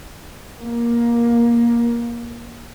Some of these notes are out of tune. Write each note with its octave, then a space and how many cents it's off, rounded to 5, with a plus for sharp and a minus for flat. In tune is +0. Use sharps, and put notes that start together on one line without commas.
A#3 +15